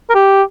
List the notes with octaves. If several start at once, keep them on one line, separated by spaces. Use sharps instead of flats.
A#4
G4